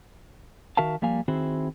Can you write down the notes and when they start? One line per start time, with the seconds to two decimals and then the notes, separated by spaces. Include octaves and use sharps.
0.77 D#3 F#4 A#4 E5 F5 A5
1.02 F3 G3 A#3 F5 G#5
1.28 D#3 C4 E4 F#4 G#4 C5